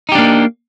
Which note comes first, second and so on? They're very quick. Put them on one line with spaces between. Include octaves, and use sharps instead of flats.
D#4 G4 D4 A#3